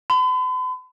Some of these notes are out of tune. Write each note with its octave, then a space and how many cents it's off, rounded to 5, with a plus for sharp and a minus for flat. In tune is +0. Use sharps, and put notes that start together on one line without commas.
B5 +45